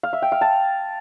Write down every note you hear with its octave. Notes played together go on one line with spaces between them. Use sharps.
F5
E5
G5
F5
A5